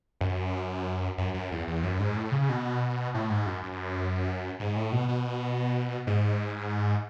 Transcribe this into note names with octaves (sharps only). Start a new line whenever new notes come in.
F#2
F#2
F#2
E2
E2
F#2
G#2
A2
C#3
B2
A2
G#2
F#2
F#2
G#2
A2
B2
B2
G#2